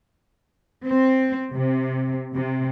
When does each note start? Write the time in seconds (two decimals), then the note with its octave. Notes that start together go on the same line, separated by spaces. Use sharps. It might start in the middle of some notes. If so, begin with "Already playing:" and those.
0.85 C4
1.53 C3
2.33 C3